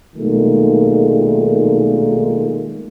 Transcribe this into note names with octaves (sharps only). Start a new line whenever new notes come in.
B1 A#2 D#3 G#3 A3